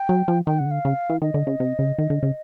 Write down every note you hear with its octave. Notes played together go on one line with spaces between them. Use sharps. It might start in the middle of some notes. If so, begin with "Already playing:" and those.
Already playing: G5
F#3
F3
D#3 G5
C#3 F#5
D3
F5
C#3
E3
D#3 D#5
D3
C#3
C3
C#3
D#3
D3
C#3